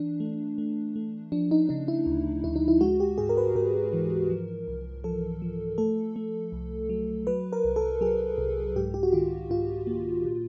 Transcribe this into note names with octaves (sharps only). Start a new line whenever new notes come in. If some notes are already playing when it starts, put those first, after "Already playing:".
Already playing: E3 D4
A3
A3
A3
F3 D4
D#4
C#3 D#4
E4
D2
D2 E4
D#4
E4
G#3 F#4
G4
G#2 G#4
A#4
B4
G#2 A#4
E3
F3
C2
F3 A4
F3
A3 A4
A3
C2
F#3
F#3 B4
A#4
C2
A4
F#3 G#4
C2
G#2 G4
G4
F#4
D#3 F4
G#2 F4
A#3
A#2